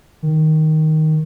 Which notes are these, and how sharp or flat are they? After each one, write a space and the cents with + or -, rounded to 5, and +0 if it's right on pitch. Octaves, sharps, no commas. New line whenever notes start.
D#3 +5